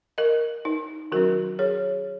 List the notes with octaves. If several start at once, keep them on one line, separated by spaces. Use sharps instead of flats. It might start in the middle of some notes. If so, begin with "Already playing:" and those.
A#4 D#5
D#4
D#3 F#3 C#4 F#4 A#4
G#4 C#5